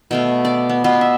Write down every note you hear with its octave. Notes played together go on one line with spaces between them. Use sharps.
B2 A3 F5
D5
B3
B2 B3 F4 C6
E5